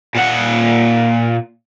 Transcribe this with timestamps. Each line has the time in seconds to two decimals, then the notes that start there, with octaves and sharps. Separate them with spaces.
0.15 A#2 F#5